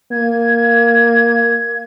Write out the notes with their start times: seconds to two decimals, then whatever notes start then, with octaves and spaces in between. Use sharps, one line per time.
0.11 A#3 G#6